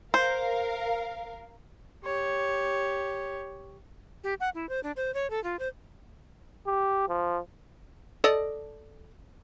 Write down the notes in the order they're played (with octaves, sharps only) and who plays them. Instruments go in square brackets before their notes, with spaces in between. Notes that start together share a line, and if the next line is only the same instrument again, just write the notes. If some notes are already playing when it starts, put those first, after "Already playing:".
[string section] A#4 F5 [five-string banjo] C5
[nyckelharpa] G4 C#5
[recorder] G4
F#5
E4
C5
D4
C5
C#5
A4
F4
C5
[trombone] G4
F3
[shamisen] A4 D5 D#5